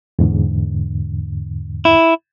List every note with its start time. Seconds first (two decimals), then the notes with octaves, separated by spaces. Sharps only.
0.19 E2 G#2 D3
1.85 E4